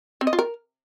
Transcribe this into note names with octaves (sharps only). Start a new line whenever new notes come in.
C4
D#5
F4
A#4